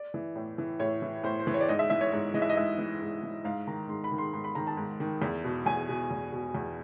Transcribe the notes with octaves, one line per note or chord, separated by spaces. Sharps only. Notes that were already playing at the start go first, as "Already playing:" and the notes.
Already playing: D5
E3
A2
E3
A2 C#5
E3
A2 C5
C5
E3
C#5
D5
G#2 D#5
E5
E3 E5
C#5
G#2 C#5
E3 D#5
E5
D#5
G#2 E5
E3
G#2
E3
G#2 F5
D#3 A#5
G#2 C6
B5
D#3
C6
G#2 C6
B5
D#3 A#5
A5
G#2
D#3
E2
B2
E2 G#5
B2
E2
B2
E2